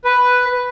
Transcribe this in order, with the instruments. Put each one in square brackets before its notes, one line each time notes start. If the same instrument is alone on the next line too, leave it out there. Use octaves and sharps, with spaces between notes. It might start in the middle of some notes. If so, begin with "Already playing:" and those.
[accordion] B4